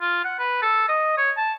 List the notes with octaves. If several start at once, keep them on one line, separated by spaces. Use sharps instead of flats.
F4
F#5
B4
A4
D#5
C#5
A5